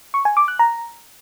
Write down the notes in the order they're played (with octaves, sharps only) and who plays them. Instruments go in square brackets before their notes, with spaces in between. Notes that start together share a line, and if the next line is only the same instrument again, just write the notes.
[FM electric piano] C#6
G#5
D6
F#6
A#5